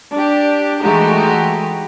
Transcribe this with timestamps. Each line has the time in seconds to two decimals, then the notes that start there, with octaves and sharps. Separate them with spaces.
0.13 D4 G4
0.82 E3 G#3 A3 D#4 F#4 G4